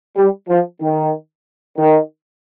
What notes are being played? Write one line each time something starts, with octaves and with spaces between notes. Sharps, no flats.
G3
F3
D#3
D#3